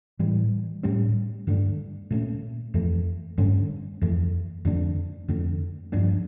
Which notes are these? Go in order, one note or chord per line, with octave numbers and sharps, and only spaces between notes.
A2 E3 G3
A2 G3 C#4
G2 D3 A3 D4
A#2 A3 C#4
F2 E3 A3
G2 D3 A3 C#4
F2 E3 A3
F2 D3 A3 D4
F2 D3 A3
G2 F3 A#3 D4